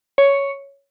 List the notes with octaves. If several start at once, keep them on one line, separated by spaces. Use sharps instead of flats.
C#5